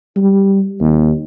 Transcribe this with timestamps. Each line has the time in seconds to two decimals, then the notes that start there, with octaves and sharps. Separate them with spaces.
0.16 G3
0.81 D#2